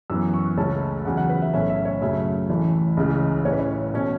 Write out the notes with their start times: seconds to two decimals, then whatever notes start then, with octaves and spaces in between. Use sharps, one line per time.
0.10 F#2 E3 B3 E6
0.34 C#6
0.57 C#2 C#3 A3 C#4 A5
1.05 E2 C#3 F#3 F#5
1.17 F#5
1.29 B4
1.42 E5
1.53 B1 A2 A3 C#4 E5
1.70 E5
1.85 C#5
2.02 F#2 C#3 F#3 A3 E5
2.49 A1 A2 E3 A3
2.97 C#2 C#3 E3
3.45 A1 A2 E3 C#4 C#5
3.52 B4
3.60 C#5
3.94 B2 A3 C#4